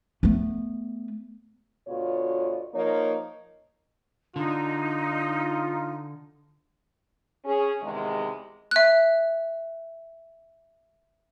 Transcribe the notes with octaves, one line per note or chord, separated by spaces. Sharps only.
A3 B3
D2 B2 F4 C#5
F3 A#3 D#4 C#5
D3 D#4 F4
C#4 G#4
E2 C3 D#3 G#3
E5 F#6